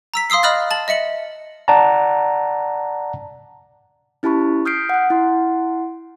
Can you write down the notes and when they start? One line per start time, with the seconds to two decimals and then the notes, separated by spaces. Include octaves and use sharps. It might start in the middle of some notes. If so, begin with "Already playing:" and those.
0.14 A#5 E6 B6
0.30 F5 C6 D#6 E6 C7
0.43 D#5 B5 D#6 F6 F#6 A6
0.71 A5 A6 F#7
0.88 D#5 E5 C#7 F#7
1.68 D5 F#5 A5 A#5
4.23 C#4 E4 G4 A5 B5 C#6
4.65 D#6 F6 G6 B6 C7 D7
4.89 F#5 F#6
5.10 E4 F#5 C6